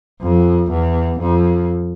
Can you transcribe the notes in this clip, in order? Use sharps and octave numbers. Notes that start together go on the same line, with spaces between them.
F2
E2
F2